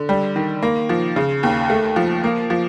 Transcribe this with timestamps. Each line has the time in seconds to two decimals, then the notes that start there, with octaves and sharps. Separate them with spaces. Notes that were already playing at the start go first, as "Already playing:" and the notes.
Already playing: D3
0.09 G3
0.36 D#3
0.63 A#3
0.89 F3
1.16 C#3
1.43 D#2
1.70 A3
1.96 F3
2.24 A#3
2.50 F3